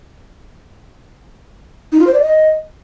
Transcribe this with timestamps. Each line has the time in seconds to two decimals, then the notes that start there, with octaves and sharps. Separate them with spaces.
1.92 D#4
1.99 F4
2.07 C5
2.14 D5
2.21 D#5